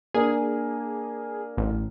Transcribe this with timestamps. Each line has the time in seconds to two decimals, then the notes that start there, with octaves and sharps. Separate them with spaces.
0.14 A#3 D4 G#4
1.57 A1